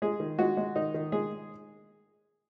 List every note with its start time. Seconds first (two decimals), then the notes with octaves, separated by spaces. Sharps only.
0.02 G#3 G#4
0.20 D#3
0.39 G#3 F#4
0.57 G#3
0.76 D#3 D#4
0.94 D#3
1.12 G#3 G#4